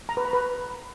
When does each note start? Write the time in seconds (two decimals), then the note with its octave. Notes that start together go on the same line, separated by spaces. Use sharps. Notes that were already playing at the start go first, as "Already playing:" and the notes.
0.09 A#5
0.17 B4
0.25 B5
0.33 B4